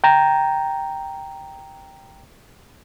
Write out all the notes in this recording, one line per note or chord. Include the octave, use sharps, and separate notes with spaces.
G5 A#5